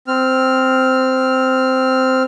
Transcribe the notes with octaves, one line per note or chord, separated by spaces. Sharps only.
C4 F6